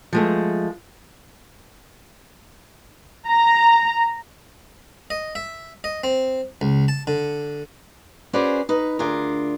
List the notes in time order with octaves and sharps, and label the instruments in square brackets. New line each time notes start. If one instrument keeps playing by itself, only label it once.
[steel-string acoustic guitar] F3 G#3 A3
[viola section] A#5
[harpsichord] D#5
E5
D#5
C4
C#2
A5
D3
[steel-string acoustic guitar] C#4 F#4 G#4 B4 C5 D5
D#4 B4
D2 D4 F4 G#4 A#4